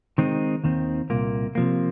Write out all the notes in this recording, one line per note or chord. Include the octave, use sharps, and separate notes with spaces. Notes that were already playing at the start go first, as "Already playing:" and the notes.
D#3 G#3 C4 D#4
D#2 D#3 C4
C2 A#2 A#3
C3 F3 A#3